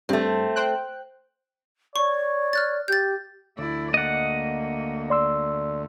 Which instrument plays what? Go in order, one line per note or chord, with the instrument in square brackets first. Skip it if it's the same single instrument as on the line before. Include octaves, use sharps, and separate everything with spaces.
[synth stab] G2 [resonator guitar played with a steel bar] A3 C4
[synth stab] C5 G5 F#6
[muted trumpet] C#5 [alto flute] D5 [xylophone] C#6
[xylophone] F6 F#6 A6
[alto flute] G4 [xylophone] G6 A6
[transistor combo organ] D2 [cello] E4 D5
[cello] A#3 [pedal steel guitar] D#5 F#5
[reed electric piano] D5 C6 E6